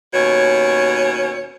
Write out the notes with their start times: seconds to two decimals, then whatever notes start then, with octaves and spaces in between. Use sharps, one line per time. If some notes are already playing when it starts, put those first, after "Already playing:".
0.14 D#2 B2 C#4 C#5